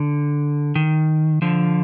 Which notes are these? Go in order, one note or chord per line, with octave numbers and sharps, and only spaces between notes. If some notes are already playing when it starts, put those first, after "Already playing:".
Already playing: D3
D#3
D3 F3